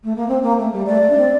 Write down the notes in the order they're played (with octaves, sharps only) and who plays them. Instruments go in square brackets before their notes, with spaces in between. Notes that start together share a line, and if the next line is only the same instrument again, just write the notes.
[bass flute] A3
A#3
C4
A#3
A3
G3
[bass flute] A3 [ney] D5
[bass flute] A3
D4
C4